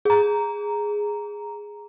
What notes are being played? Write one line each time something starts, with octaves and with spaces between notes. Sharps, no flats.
G#4 A#5